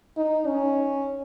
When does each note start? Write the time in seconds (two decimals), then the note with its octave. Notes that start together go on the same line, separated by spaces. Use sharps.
0.17 D#4
0.47 C#4